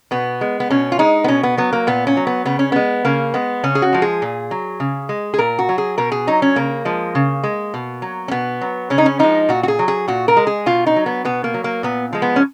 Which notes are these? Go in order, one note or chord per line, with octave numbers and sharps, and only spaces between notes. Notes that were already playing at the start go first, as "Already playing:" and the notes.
B2 B3
G#3
B3
B2 C#4
F4
G#3 D#4
B3
B2 C#4
B3
F#3 B3
A#3
A#2 B3
C#4
F#3
B3
C#3 B3
C#4
G#3 B3
C#3 A#3
G#3 B3
C#3 C#4
G#4
F#4
F3 G#3
G#4
A#2
F#3
C#3
G#3
G#4
A#2 A#4
F#4
F#3
G#4
B2 A#4
G#4
F#3 D#4
C#4
C#3 A#3
F3 G#3
C#3
G#3
B2
F#3
C#4
B2 B3
F#3
C#3 C#4
D#4
C#4
F3 G#3 D#4
A#2 F#4
F#4
G#4
F#3
G#4
A#2 F#4
A#4
G#3
G#4
B2 F4
D#4
F#3
B3
B2 B3
A#3
F#3
A#3
A#2 B3
F3 G#3
B3
C#4